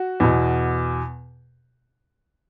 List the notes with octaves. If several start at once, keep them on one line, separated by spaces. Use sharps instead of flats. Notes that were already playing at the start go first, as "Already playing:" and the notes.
Already playing: F#4
E2 B2